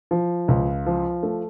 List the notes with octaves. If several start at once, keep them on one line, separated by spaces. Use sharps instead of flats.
F3
C#2
F3
A3